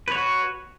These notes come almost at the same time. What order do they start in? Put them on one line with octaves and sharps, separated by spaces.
B4 C#5 F#4